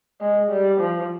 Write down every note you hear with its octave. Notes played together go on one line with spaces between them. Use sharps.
G#3
G3
F3